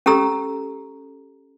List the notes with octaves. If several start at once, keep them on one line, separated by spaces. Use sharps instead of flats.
C#4 G4 A4 A#5 E6